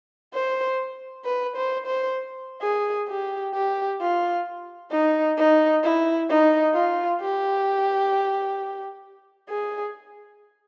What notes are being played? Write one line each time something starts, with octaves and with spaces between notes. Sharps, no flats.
C5
B4
C5
C5
G#4
G4
G4
F4
D#4
D#4
E4
D#4
F4
G4
G#4